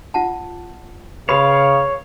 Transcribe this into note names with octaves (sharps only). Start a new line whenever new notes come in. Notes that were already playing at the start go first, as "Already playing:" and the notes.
F4 F#5 A5
C#3 B4 C#5 F5 B5 C6